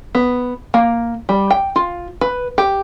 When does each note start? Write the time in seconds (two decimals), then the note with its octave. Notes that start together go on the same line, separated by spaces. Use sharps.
0.15 B3
0.74 A#3
1.29 G3
1.51 G5
1.76 F4
2.21 B4
2.58 G4